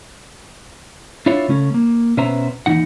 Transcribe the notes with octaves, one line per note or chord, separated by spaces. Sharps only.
D4 E4 F4 C#5
C#3 A3 C#4
A#3
B2 C#4 B4 C5 E5 A#5
D#2 E3 D#4 F#5